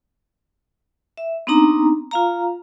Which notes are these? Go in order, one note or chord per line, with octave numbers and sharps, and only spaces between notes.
E5
B3 C4 D4 D#4 A#5
F4 F5 A#5